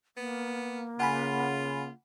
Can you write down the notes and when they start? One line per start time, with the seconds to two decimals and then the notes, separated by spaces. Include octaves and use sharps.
0.17 A#3 B3
1.00 C#3 F4 F#5 G#5 B5